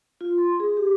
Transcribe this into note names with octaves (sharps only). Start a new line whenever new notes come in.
F4
C6
G#4
G4